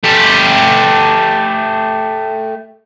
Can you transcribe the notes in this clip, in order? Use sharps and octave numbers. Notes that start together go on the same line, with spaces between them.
A3 G4